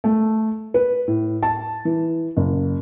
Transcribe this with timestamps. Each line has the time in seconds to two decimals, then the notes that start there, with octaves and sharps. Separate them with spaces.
0.04 A3
0.74 B4
1.08 A2
1.43 A5
1.85 E3
2.37 F#1